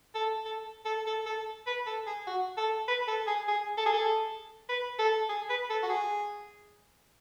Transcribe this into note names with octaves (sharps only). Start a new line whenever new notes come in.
A4
A4
A4
A4
A4
B4
A4
G#4
F#4
A4
B4
A4
G#4
G#4
A4
G#4
A4
B4
A4
G#4
B4
A4
F#4
G#4